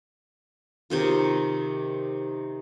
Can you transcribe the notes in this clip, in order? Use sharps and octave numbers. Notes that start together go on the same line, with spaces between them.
C3 D#3 F4